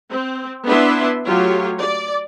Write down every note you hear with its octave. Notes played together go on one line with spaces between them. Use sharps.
C4
B3 D4 E4 B4 E5 C6
F#3 A3 F4 G4 C#5
D5